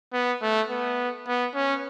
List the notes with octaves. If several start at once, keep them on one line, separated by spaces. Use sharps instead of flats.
B3
A3
B3
B3
C#4